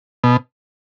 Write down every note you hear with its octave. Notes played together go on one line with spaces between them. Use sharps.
B2